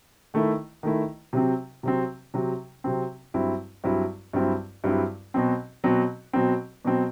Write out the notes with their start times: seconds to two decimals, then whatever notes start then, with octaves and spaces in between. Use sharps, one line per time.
0.34 D#3 A3 E4
0.83 D#3 A3 E4
1.33 C3 F#3 C4
1.83 C3 F#3 C4
2.34 C3 F#3 C4
2.84 C3 F#3 C4
3.34 G2 F#3 C4 E4
3.84 G2 F#3 C4 E4
4.33 G2 F#3 C4 E4
4.84 G2 F#3 C4 E4
5.34 B2 F#3 C4
5.84 B2 F#3 C4
6.33 B2 F#3 C4
6.85 B2 F#3 C4